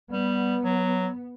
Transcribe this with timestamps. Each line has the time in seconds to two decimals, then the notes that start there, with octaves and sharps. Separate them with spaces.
0.10 G3 B3
0.64 F#3